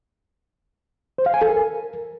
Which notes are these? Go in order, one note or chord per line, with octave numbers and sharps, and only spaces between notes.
C5
F5
G#5
A4
A#4